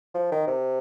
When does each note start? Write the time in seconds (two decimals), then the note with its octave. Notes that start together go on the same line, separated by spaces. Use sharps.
0.14 F3
0.31 D#3
0.47 C3